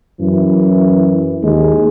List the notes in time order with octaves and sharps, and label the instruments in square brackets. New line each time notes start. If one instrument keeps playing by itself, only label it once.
[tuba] F#2 [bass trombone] E3
[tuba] D#2 [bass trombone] G#3